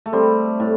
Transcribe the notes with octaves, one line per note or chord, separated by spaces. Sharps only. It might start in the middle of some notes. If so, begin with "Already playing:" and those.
A3
G3 C4
A2